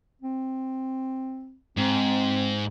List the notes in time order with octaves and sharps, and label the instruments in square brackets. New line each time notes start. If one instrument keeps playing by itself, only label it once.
[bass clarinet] C4
[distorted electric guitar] G#2 [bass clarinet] C4